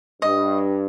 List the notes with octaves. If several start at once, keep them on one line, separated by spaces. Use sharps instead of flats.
G2 D#5